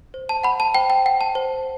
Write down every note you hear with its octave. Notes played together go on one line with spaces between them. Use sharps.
C5
A5
F#5 B5
A5
C5 G5
G5
F#5 G5
A5
C5